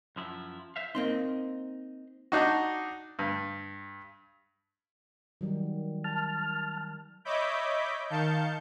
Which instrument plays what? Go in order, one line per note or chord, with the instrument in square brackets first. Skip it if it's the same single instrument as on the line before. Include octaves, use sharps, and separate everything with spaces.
[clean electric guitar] F#2 F3 E4
C5 E5 F5
[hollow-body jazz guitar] A#3 C4 D#4 [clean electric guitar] D#5 C6
[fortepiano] D4 D#4 F#4
G2
[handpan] D#3 F#3 G3
[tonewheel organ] A5 F6
[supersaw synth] C#5 D#5 E5 B5 D6 G6
D#3 F5 A5 G6 C#7